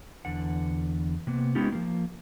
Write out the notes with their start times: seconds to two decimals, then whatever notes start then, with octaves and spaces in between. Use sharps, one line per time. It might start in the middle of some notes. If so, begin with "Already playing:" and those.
0.25 E2 D3 F#5
1.27 C3 A#3 B3
1.55 G#3 B3 C#4 D#4 F4 G4
1.72 F3 A#3